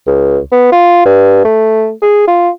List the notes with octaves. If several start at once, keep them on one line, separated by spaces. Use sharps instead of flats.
C#2
B3
F4
G2
A3
G#4
F4